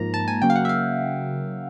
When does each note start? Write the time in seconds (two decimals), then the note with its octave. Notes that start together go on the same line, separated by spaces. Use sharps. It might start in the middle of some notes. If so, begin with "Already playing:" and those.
Already playing: G#2 F3 A#3 A#5
0.14 A5
0.28 G#5
0.42 C#3 F#3 A#3 G5
0.50 F5
0.56 F#5
0.65 E5
0.69 F5